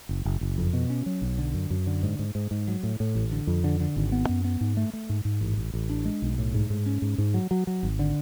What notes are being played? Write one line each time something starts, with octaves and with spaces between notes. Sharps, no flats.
F#1
F#1
F#1
F2
B2
C#4
F#3
B1
D3
F#2
F#2
D3
G#2
G#2
G#2
G#2
F#3
A2
A2
A1
D3
F2
D3
D3
G#1
B3
F#2
B3
G#2
A3
A3
G#2
G#2
A1
A1
A1
D4
G#3
B1
A2
G#2
G#2
C#4
G#2
G#2
F#3
F#3
F#3
G#1
D3